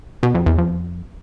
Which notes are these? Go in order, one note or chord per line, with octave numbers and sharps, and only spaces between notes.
B2
F2
E2
F2